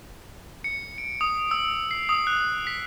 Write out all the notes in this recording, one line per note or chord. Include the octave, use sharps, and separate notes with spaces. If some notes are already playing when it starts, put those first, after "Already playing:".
C#7
D7
D#6
E6
C7
D#6
F#6
B6